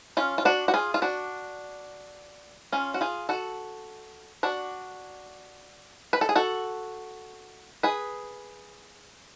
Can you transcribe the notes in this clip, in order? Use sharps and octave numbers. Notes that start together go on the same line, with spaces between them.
C#4 F4
F4
D4 F#4
F#4
F4 G#4
F4
D4 F#4
C#4 F4
F#4
F4 G#4
F#4 A4
D4 F#4
B4
A4
G#4
F#4 A4
G#4 B4